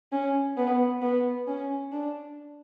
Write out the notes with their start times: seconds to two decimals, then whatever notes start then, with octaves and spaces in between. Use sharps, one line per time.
0.12 C#4
0.57 B3
1.02 B3
1.47 C#4
1.92 D4